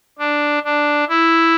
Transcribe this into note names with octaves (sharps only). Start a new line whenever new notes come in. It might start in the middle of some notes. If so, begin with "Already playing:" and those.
D4
D4
E4